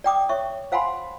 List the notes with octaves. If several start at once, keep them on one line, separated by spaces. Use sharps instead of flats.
D5 G5 D6 D#6
C#5 E5 C#6
C5 F5 F#5 G#5 B5 C6